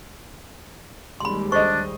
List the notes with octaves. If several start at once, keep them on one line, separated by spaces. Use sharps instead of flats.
D#2 G3 G#3 B5 C6
D4 C5 D#5 C#6